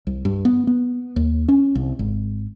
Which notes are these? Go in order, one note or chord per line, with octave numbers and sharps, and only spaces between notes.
C2
G2
B3
B3
D#2
C#4
C2
G#1